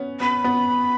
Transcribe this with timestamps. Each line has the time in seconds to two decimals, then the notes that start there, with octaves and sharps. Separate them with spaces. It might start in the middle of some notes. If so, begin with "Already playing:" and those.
Already playing: B3 C#4
0.20 B3 B5
0.44 B3